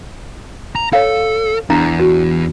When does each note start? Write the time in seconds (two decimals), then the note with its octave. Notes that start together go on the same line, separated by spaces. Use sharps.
0.76 A#5
0.93 A4 C#5 F5
1.70 E2 D4 E4 A#5
1.99 F#4